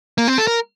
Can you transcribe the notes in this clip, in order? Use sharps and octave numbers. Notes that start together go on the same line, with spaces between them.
A#3
C4
A4
A#4